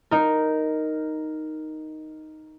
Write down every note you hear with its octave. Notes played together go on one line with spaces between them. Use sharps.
D#4 A#4